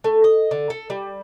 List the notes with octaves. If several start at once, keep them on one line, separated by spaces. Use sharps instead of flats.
A3
D#5
D3
A4
G3